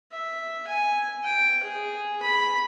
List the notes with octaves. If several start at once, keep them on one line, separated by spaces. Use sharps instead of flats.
E5
G#5
G5
G#4
B5